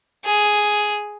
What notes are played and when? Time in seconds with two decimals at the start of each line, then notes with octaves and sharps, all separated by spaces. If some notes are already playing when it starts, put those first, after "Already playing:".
0.25 G#4